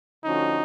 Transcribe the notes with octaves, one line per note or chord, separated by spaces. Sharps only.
D3 F3 A3 C#4 D#4 F#4